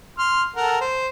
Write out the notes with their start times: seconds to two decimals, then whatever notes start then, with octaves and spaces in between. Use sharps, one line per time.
0.18 C6 F6
0.56 A4 A#4 F#5
0.81 C5